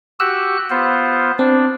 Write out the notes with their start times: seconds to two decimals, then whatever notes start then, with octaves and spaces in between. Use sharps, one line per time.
0.20 F#4 G4 E6 F#6
0.70 B3 F4 C5
1.39 C4 D4